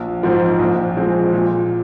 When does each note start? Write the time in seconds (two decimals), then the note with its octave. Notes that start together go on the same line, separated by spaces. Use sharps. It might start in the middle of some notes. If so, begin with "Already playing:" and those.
Already playing: A#1
0.23 G#2 F3 C4
0.59 A#1
0.96 A#2 F3 G#3 C4
1.33 A#2